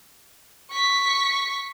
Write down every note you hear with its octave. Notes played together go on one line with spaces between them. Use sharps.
C#6 B6